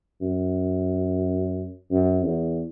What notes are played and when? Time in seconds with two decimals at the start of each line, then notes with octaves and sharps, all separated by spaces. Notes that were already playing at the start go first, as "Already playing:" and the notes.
0.22 F#2
1.91 F#2
2.24 E2